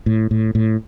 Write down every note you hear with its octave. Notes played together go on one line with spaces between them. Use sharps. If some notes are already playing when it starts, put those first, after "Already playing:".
A2
A2
A2